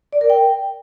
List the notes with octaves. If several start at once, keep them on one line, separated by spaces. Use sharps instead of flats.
D5
A#4
G5